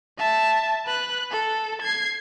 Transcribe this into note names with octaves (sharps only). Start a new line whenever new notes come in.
E5 A5
B4 F#6
A4
G#6 C7